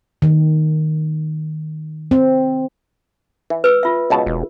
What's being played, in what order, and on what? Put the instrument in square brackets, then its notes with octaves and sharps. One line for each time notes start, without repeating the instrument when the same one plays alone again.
[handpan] D#3
C4
[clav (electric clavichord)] E3
[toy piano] B4 E6
F4 E5
[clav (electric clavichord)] C#2 B2 A5
[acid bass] E1